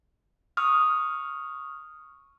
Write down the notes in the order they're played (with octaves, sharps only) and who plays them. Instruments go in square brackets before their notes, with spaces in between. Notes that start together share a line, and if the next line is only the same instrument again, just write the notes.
[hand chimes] C#6 D#6 F6